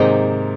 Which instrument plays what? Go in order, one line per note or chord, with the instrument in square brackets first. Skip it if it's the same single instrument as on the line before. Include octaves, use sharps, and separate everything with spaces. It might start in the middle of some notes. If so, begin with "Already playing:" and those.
Already playing: [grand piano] G#2 C3 [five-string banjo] D#3 A#3 D#4 G#4 C5